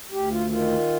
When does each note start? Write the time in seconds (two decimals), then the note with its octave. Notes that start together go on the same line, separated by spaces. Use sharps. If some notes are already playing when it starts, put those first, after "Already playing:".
0.12 D2 G4
0.31 F4
0.50 D#3 F4